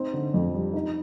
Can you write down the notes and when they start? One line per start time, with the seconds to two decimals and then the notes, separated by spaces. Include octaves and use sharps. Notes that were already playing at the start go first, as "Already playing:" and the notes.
Already playing: C4 D#4
0.13 D3
0.34 F2
0.54 G3
0.74 D#4